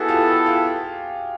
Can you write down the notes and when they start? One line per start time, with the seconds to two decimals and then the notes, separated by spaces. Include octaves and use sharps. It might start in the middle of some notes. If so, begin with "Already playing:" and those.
Already playing: B3 E4 F#4 G#4 A4
0.08 F4 G4
0.46 F4 G4